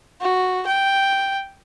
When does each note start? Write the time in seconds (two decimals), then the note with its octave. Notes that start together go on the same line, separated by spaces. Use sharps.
0.21 F#4
0.66 G5